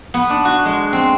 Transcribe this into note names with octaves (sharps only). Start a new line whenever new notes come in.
B3
D4
F#4
G#3
C4